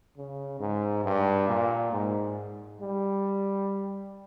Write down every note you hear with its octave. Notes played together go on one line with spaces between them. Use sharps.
C#3
G#2
G2
A#2
G#2
G3